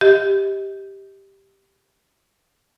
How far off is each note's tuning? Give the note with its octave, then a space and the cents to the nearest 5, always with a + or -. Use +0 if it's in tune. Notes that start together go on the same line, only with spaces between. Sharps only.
G4 +0 D#5 +25